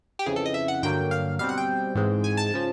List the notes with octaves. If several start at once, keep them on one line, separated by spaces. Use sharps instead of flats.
G4
F2 C#3 E3 G#4
A4
D#5
E5
F#5
G2 D3 F#3 A#3 G5
F5
B2 G3 C4 F5
F#5
G5
G#2 E3 G#3 C4
G#5
A5
C#3 F3